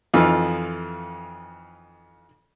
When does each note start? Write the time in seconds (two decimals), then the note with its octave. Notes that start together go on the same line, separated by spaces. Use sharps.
0.14 F2 E3 D#4 F4